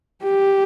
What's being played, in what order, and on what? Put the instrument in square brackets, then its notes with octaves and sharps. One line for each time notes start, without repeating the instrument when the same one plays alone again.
[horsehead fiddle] G4